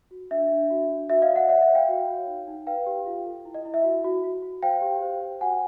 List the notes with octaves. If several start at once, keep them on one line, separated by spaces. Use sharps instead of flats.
F#4
D4 E5
D4
F#4
D4
F#4 E5
D#5 F5
D5
E5 F#5
C#5 E5 F#5
E5 F#5
C#5
F5 G5
F#4
F#4
D#4
D#4
B4 F5 G5
G4
F4
A4
E4
D#5
E4
E5
F#4
F#4
F#4
F#4
C5 F5 G5
G4
C5
C5
F#4 F#5 G#5